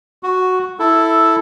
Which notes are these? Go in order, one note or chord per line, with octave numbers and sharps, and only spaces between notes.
F#4
E4 A4